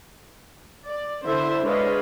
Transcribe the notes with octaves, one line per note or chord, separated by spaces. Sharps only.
D5
D3 E4 C5 E5
G#3 D4 B4 C#5 D#5 F5